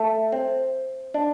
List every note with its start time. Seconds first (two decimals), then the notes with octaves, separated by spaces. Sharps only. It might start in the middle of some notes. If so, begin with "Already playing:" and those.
Already playing: A3
0.32 C4
1.14 D4